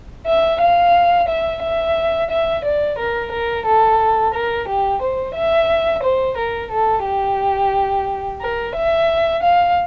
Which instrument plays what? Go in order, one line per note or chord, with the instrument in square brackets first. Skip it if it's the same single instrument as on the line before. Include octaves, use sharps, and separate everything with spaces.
[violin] E5
F5
E5
E5
E5
D5
A#4
A#4
A4
A#4
G4
C5
E5
C5
A#4
A4
G4
A#4
E5
F5